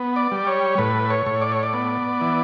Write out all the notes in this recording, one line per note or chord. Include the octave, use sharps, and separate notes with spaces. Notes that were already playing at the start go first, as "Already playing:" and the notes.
Already playing: B3
D5
G3
C#5
A2 B4
C#5
A2
D5
C#5
D5
B3
E3